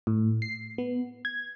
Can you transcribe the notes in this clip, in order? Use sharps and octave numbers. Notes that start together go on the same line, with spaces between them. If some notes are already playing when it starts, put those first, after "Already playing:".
A2
C7
B3
G#6